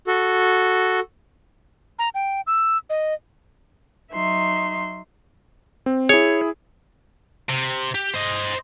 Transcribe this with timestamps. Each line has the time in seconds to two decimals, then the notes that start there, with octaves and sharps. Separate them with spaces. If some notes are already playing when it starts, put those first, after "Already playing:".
0.07 F#4 A4
1.99 A#5
2.14 G5
2.47 E6
2.90 D#5
4.12 F#3 D#4 E5 C6
5.86 C4
6.09 E4 G#4 C#5
7.49 C3
7.95 G4
8.14 C5 D#5